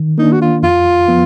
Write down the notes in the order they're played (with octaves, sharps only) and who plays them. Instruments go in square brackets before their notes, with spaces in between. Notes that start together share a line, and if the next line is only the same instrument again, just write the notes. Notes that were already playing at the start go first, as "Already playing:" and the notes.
Already playing: [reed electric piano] D#3
[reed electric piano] A#3 D4 [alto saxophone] D#4
[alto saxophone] F#4
F4
[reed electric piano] F2 [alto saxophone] F4
[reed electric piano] F3 B3